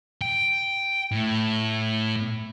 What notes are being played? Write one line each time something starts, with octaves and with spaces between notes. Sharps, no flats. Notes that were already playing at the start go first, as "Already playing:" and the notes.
G5
A2